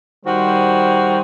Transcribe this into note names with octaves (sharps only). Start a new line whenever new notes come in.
D#3 G3 F#4 C5